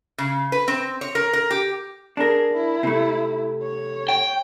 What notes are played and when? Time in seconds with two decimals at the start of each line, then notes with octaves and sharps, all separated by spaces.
0.18 C#3
0.52 B4
0.68 C4
1.01 C#5
1.15 A#4
1.33 A#4
1.51 G4
2.17 D4 G#4 A#4
2.54 E4
2.83 C3 A3
3.63 C#5
4.09 G5